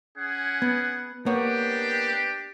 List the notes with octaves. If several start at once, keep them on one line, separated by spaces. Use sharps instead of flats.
C#4 G#4 F#5
B3
A#3 B3 D4 G4 C#5